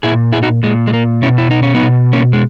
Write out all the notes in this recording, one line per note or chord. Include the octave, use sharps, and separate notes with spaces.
A#2 E4 G#4
E4 G#4
D#4 F#4
A#2 G#3
G#3
A#3
B2 C#4 E4
E4
D#4
C#4
B3 D#4
B2
A#3 C#4
G#3